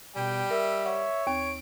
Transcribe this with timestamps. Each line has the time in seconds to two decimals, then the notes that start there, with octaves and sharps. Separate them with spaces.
0.16 B2 G3 G5
0.50 A#4 E5
0.86 C#5 F#5
1.27 D#2 C4 C#6 D7